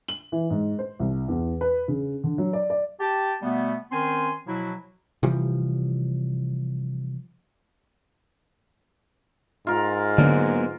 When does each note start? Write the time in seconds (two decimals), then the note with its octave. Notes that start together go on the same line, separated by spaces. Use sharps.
0.08 F#7
0.32 E3
0.50 G#2
0.79 C5
1.00 C2
1.28 E2
1.61 B4
1.88 C#3
2.24 D3
2.38 F#3
2.53 D5
2.70 D5
3.00 G4 A5
3.43 B2 G3 A3 B3
3.92 D#3 C4 C#4 G#5 C6
4.47 B2 F3 F#3 E4
5.23 C3 E3 F3 G3
9.67 G#2 F4 A#4
10.18 D3 F#3 A#3 B3